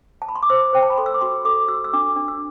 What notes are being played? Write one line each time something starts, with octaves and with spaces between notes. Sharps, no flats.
A5
B5
C6
D6
C5 E6
C5 G5
A5
B5
A4 C6
E6
D6
F#4 C6
A4 D6
F#4 E6
E6
D4 D6
D4
E6